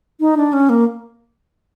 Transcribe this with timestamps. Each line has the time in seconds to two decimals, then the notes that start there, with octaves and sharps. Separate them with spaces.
0.20 D#4
0.37 D4
0.53 C#4
0.69 A#3